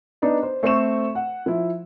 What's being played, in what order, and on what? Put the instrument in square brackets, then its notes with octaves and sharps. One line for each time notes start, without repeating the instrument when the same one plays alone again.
[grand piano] B3 D4 D#4
C5
A3 C4 A4 C#6 E7
F#5
F3 E4